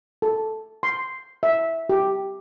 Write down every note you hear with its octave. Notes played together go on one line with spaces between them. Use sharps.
A4
C6
E5
G4